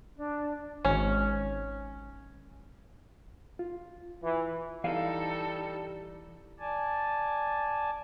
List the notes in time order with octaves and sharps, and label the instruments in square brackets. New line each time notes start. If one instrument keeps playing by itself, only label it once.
[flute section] D4
[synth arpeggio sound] G#1 G#2 [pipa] C#4
[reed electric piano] F4
[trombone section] E3
[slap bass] E3 [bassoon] G3 [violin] D#4 A4 [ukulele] F5
[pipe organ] D5 G#5 A5